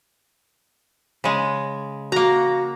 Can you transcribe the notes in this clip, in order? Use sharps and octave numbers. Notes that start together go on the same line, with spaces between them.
C#3 G#3
A#3 F#4 A#5